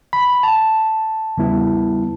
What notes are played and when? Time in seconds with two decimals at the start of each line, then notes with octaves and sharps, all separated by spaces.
0.13 B5
0.43 A5
1.37 E2 C#3 G3 B3 E4